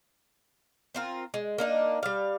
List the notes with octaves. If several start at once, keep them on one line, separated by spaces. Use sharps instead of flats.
C4 F4 A#4
G#3
A#3 D4 D#4
G3 F5